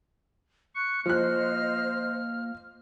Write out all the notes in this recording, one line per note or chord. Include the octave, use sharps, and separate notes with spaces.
C#6 F#6 C#7
F3 A#3 C5 D#5 F6 F#6